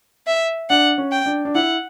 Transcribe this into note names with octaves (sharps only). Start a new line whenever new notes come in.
E5
D4 F#5
C#4
G5
D4
D4
E4 F#5